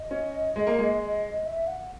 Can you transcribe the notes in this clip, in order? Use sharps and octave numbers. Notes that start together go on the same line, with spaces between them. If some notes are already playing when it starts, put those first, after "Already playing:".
Already playing: D#5
C#4
G#3
A#3
G#3
E5
F#5